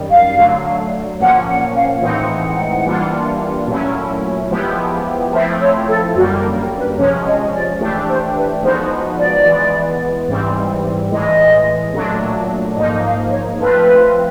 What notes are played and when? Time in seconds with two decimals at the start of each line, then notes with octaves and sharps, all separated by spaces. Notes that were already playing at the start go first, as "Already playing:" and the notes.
Already playing: F#2 D#3 G3
0.09 F5
0.37 D3 F#3 A3
1.20 A#2 F3 A#3 C#4 F#5
1.48 F#5
1.75 F5
2.02 A2 E3 G#3 C4 D#4 F#5
2.85 E3 G3 A#3 D4 F4
3.67 A#2 F#3 A3 C#4 E4
4.50 F3 G#3 B3 E4 G4
5.33 F3 A3 C4 E4 E5
5.60 C#5
5.88 A4
6.15 F#2 D3 G3 A#3 F#4
6.37 A#4
6.57 A#4
6.78 B4
6.98 C3 F3 G#3 C#4 C#5
7.26 D#5
7.53 D5
7.81 E3 A3 D4 G4
8.08 C5
8.36 B4
8.63 F3 G#3 B3 D#4 F#4 C5
9.18 D5
9.46 E3 G#3 B3
10.28 G#2 E3 G3 C4
11.11 A2 E3 G#3 D#5
11.93 A#2 F#3 A3 D4
12.75 G#2 F3 A#3 D#4 D#5
13.04 F5
13.31 C#5
13.58 F3 A3 C4 F4 B4